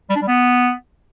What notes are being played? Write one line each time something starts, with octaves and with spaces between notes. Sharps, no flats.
G3
D4
G3
B3